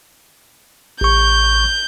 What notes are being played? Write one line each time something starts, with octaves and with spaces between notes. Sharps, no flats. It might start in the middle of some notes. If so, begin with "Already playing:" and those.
A1 C#6 G6